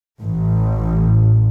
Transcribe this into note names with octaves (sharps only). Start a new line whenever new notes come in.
A1